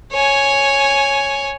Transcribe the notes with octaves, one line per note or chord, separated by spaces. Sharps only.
C#5 G#5